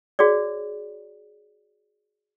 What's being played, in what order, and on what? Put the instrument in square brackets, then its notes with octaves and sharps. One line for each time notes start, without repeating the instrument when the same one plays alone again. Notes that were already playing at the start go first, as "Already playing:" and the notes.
[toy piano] F#4 G#4 C#5 D5